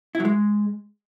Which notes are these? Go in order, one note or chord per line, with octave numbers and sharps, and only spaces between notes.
E4
F#3
G#3